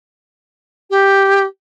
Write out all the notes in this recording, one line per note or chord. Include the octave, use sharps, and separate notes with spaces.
G4